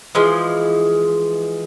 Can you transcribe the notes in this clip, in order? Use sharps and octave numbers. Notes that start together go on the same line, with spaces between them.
E3 F3 G#3